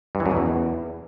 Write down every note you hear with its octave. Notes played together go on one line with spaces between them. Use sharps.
G2
E3
F#2
B2
E2